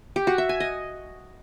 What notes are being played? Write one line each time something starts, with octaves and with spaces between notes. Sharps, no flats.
G4
F#4
E5
G#5
D#5